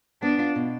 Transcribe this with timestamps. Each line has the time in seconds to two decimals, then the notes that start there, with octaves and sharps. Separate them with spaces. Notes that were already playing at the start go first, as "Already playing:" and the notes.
0.22 B3 D4
0.39 F4
0.56 B2